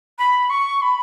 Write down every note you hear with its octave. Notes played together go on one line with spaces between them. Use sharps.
B5
C#6
B5